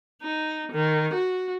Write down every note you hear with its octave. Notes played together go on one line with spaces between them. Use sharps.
D#4
D#3
F#4